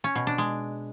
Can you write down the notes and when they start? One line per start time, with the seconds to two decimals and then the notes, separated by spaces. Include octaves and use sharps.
0.04 C#4
0.15 B2
0.27 D4
0.38 G#3